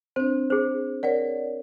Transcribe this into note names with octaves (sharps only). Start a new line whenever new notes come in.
C4 D4 C5
G#4 C5
A#4 C#5 D5 F#5